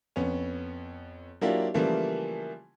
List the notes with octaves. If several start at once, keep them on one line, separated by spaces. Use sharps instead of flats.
F2 B3 C#4
F#3 A#3 D4 E4 F4 G4
C#3 E3 F3 G3 A3 A#3